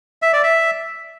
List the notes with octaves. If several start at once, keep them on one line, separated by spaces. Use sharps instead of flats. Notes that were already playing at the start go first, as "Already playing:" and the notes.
E5
D5
E5